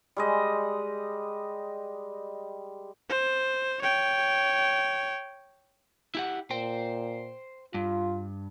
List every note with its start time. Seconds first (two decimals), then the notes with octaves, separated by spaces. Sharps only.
0.16 G3 G#3 D#5
3.09 C5
3.81 C#5 G5
6.15 E4 G4 F#5
6.50 A#2 C5 G5
7.74 G2 F4